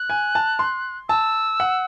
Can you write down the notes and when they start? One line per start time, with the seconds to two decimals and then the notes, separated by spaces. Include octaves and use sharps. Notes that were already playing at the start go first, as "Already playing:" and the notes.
Already playing: F#6
0.10 G#5
0.35 A5
0.59 C6
1.09 A5 E6
1.60 F#5